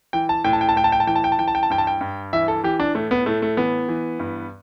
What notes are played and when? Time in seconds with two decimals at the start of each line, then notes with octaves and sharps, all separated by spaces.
0.13 E3 G5
0.29 A5
0.44 A2 G5
0.53 A5
0.61 G5
0.69 A5
0.76 A2 G5
0.84 A5
0.92 G5
1.00 A5
1.07 E3 G5
1.16 A5
1.24 G5
1.32 A5
1.38 E3 G5
1.48 A5
1.55 G5
1.63 A5
1.70 G2 G5
1.78 A5
1.87 G5
2.01 G2
2.33 E3 E5
2.48 A4
2.64 E3 G4
2.80 D4
2.95 A2 A3
3.11 B3
3.26 A2 A3
3.42 A3
3.57 E3 B3
3.89 E3
4.19 G2